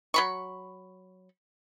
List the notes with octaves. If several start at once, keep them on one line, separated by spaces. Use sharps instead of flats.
F#3 B5 C#6